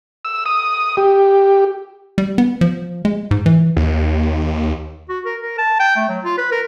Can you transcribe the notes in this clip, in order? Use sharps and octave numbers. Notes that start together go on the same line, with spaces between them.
E6
D#6
G4
G3
B3
F3
G#3
G#2
E3
D#2
F#4
A#4
A#4
A5
G5
A3
F#3
F4
B4
A#4